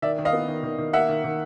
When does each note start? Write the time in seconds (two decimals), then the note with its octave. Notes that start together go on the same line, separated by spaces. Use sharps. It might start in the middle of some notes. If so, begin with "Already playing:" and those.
0.02 D#3 D5 E5
0.19 D#3
0.25 D#5 F5
0.33 B3
0.48 D#3
0.63 D#3
0.79 D#3
0.93 A#3 E5 F#5
1.09 D#3
1.24 D#3